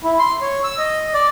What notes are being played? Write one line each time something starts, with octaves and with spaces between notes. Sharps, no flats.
E4
C6
C#5
E6
D#5
D5